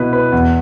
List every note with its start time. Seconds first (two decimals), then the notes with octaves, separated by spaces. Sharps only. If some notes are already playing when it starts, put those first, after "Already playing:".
Already playing: B2 E4 B4
0.13 B4
0.32 E2